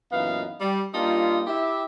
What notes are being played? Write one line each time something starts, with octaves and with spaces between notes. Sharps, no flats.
F#2 A#2 E3 B3 D#4 F5
G3
G3 A#3 D4 D#4 F4
E4 G4 E5